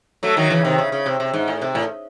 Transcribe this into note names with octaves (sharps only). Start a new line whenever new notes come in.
F#3 A3
D#3 F#3
C#3 E3
C3 D#3
C#3
C#3
C3
C3
G#2
A2
C3
A2